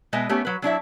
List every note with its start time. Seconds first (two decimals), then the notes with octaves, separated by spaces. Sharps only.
0.13 B2 G#3 B4 D#5 E5
0.29 A3 B3 C#4 G4 C#5
0.45 F#3 B4
0.62 F#3 D4 E4 E5